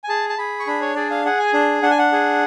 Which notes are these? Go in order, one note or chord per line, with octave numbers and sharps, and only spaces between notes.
G#5
G#4 A5
A5
G#4 B5
C#6
D4 B5
C#5
G#4 D5
F5
G#4 F#5
G#5
D4
D4 F#5
G#5
F#5
G#4